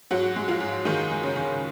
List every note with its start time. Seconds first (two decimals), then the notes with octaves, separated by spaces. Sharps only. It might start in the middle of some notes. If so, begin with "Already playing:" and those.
0.11 G#2 F#3 F#4
0.36 G#3
0.48 F3 F4
0.60 G#2
0.85 D#3 G#3 D#4
1.11 G#3
1.23 C#3 C#4
1.36 D#3